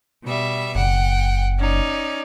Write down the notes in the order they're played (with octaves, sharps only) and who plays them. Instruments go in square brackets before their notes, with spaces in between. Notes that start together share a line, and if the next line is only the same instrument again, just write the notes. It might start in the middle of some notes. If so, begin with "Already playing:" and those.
[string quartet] B2 G3 E5
[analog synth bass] F#1 [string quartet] F#5 G5
[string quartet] C#4 D#4 D5